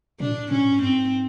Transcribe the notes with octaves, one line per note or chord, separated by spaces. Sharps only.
B2 D4
A2
A2 C#4
G2
G#2 C4